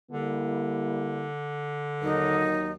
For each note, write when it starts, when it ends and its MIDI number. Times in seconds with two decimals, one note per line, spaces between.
0.11 2.62 50
0.11 1.29 55
0.11 1.29 58
0.11 1.29 64
2.02 2.73 39
2.02 2.73 54
2.02 2.72 63
2.02 2.73 70